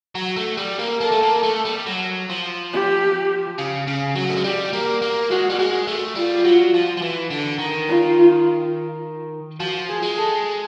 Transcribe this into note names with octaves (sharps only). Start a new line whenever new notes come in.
F#3
A3
G3
A#3
A#3 A4
A3
A#3
A3
G3
F#3
F3
G4
C#3
C#3
F#3
A3
G#3
G3 G4
A#3
A#3
G#3 F#4
G3
G#3
A3
G3 F4
F#3
F3
F3
E3
D3
D#3
F4
F3 F#4
G#4
G#3
A4